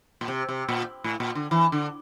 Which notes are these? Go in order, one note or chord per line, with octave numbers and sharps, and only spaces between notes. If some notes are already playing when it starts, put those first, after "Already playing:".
A#2
C3
C3
A#2
A2
A#2
D3
E3
D3